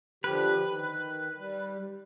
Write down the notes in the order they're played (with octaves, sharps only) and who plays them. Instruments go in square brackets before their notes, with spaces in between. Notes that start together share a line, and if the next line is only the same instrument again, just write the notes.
[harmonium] D3 F3 G4 [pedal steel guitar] B4
[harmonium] D#3
G3